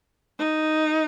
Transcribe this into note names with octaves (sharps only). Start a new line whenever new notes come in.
D#4